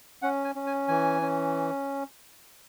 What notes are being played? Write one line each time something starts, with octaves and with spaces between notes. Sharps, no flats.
C#4 F#5
G#5
C#4
G#5
E3 G#5
C#4